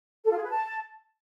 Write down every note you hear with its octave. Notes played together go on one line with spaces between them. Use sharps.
A4
F4
G#4
B4
A5